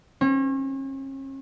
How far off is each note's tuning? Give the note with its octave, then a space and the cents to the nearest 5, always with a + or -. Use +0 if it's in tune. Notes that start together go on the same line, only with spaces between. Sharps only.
C#4 -40